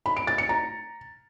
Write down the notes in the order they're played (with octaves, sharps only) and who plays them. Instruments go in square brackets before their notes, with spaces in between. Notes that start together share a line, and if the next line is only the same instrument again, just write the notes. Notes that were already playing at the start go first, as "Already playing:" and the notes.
[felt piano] B5
D7
A6
C#7
A#5